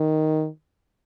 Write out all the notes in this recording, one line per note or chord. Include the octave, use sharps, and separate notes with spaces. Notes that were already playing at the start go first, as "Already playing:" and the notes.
Already playing: D#3